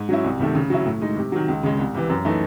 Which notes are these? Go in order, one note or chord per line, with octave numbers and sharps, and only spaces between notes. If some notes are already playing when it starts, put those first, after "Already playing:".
Already playing: G#2
F#3 C#4 E4
C2
C3 D#3 A3
C#3
F#3 C#4 E4
A2
G#3 D#4
C3
D#3 F#3
C#2
C#3 G#3
C2
C3 E3
F#2
E3 A3 D#4